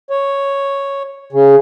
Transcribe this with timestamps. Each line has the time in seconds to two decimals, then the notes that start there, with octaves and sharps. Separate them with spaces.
0.10 C#5
1.33 C#3